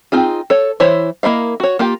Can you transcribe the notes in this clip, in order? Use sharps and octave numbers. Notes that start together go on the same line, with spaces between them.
C4 D#4 F4 G#4
A4 C#5
E3 E4 C5 C#5
A#3 E4 D#5 F5
F#4 C#5
A#3 F4 G4